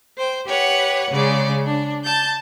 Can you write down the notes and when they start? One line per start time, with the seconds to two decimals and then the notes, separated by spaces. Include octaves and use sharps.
0.15 C5 G5
0.46 G4 B4 C#5 F#5
1.10 C#3 G#3 D5
1.66 D4
2.04 A5 G6 A6